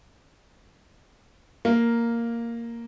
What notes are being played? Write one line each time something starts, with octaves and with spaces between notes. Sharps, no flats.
A#3